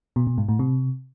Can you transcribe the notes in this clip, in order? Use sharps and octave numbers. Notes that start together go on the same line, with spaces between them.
B2
B2
G#2
A2
C3